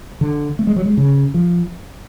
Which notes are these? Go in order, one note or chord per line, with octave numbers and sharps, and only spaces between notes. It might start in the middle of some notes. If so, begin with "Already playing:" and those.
D3
A3
G#3
F#3
G#3
C#3
F3